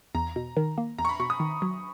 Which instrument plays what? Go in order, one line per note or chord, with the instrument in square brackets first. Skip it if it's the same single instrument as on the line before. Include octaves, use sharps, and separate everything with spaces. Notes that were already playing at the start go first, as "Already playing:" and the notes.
[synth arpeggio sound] E2 [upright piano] A#5
[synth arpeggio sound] B2
D#3
A#3
[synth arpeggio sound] E2 [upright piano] A#5
[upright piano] C#6
B5
[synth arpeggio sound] B2 [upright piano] C#6
[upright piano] D#6
[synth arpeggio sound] D#3
F#3